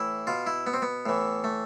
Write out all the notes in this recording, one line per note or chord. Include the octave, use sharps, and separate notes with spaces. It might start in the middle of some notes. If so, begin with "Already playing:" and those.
Already playing: A2 E3 E4
B2 F4
E4
B3
C4
B3
A2 E3
A3